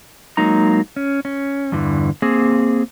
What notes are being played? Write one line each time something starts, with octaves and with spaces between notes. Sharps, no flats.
F#3 G#3 A#3 D#4 A#5
C#4
C#4
E2 G2 D3 E3
A#3 C4 G#4